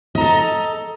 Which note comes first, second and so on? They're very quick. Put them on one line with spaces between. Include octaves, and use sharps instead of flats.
D#5 A#5 A4